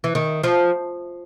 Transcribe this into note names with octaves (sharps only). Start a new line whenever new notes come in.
E3
D#3
F3